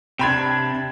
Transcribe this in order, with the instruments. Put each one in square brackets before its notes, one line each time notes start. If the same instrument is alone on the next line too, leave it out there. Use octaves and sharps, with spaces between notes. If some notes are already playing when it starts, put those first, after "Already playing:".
[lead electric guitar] C3 D4 [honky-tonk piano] G5 B5 G#6